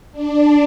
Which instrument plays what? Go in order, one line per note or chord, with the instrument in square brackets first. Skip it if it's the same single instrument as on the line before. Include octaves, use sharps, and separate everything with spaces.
[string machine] D4